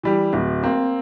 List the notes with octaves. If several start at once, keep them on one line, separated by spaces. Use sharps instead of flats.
E3 G3 G4
D1
A#3 C4